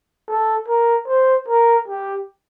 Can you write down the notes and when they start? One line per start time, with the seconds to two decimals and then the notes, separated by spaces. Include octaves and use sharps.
0.28 A4
0.68 A#4
1.07 C5
1.48 A#4
1.88 G4